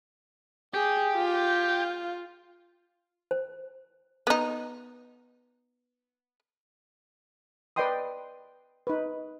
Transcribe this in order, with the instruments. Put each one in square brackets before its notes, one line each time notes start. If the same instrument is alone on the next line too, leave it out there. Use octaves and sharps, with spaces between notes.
[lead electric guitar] G4 [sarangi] G#4
[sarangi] F4
[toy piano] C5
[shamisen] B3 D#4
[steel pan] B4 D5 D#5 G5 C6 D#6
D#4 B4